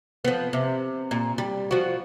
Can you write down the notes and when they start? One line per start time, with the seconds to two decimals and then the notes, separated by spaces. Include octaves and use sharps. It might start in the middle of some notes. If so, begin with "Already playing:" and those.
0.25 F3 B3
0.53 C3
1.11 A#2
1.38 G3
1.71 F3 F#4